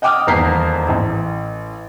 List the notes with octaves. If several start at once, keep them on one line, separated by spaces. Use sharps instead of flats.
D#5 F#5 G5 D6 D#6 F6
D#1 E2 A#4 A#5 B6 C7
A1